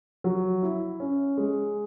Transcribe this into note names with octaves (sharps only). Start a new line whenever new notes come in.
F#3
E4
C#4
G#3